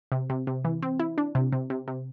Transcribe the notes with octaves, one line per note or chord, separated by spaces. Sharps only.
C3
C3
C3
E3
C4
E4
D4
C3
C3
C3
C3